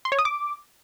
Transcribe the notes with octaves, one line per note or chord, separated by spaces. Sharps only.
C6
C#5
D#6
D6